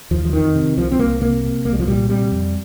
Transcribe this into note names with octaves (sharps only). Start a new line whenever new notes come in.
D#2 F3
F3
F2 D#3
C3
C2 F3
C4
C2 A#3
C3 A#3
C3
C2 A#3
G3
F3
A#2 G3
C3 G3
F2